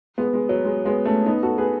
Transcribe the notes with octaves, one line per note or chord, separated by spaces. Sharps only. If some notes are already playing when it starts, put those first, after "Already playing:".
G#3 B3
G#3
F#3
G#3
G#3 B3
A3 C#4
B3 D#4
F#4 A4
G#4 B4